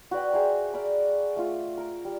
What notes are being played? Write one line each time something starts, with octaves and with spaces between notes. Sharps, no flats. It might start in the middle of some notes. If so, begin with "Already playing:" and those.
F#4 B4 D5 G5
G#4 C5 E5 A#5
A#4 D5 B5
A3 F4
A#4
G3